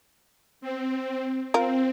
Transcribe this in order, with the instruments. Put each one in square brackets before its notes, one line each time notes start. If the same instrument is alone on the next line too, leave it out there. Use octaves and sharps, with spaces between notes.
[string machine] C4
[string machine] C4 [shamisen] F4 A#4